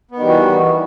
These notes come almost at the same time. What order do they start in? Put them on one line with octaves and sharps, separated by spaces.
B3 D#3 G3 E3 F#4